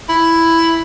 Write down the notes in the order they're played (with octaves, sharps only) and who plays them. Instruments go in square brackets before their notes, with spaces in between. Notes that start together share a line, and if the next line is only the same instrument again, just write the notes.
[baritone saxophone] E4